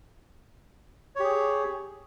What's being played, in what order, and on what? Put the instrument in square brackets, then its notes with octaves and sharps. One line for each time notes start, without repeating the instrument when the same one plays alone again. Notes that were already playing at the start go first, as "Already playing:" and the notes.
[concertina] C#5
G4
G#4